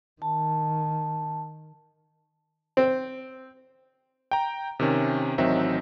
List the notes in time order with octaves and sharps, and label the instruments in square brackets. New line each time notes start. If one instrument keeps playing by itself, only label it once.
[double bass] D#3 [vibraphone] A5
[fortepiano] C4
[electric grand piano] G5 A#5
C3 D#3 C#4
A1 D#3 F#3 C4 D#4 E5